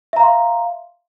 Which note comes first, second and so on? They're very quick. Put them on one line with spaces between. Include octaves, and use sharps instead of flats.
E5 A#5 F5 C6